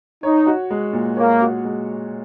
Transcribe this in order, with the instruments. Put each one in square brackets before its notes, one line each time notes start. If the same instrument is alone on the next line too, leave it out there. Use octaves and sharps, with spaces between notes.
[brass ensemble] D#4 [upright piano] C#5
[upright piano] F#4
G#3
A#2
[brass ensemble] A#3 [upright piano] C#5
[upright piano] F#4
G#3